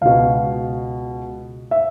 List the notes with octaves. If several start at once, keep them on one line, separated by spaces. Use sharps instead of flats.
C#2 B2 F5
E5